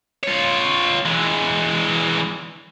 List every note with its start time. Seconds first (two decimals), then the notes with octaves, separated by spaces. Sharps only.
0.24 F4 C#5
1.06 E3 G#3